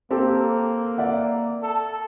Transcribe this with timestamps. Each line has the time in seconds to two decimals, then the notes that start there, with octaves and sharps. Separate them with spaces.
0.11 A#3 C4 G4 A4
0.98 D5 E5 F#5
1.62 A4